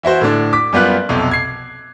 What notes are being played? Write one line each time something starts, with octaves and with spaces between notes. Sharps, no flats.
E3 E4 F#4 C5
A2 D3 D4
D6 B6
F#2 G3 B3 F4 F#6
B1 F2 C3
G#6 C7